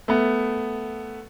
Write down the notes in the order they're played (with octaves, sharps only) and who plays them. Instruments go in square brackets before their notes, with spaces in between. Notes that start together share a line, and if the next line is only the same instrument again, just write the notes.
[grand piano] A3 B3